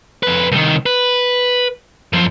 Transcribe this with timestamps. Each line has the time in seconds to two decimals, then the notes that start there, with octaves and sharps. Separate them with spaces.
0.23 F2 B4
0.52 C2 D#3
0.86 B4
2.13 F#2 F3